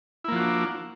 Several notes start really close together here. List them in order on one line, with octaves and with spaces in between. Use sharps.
E4 A#3 F3 F#4 D4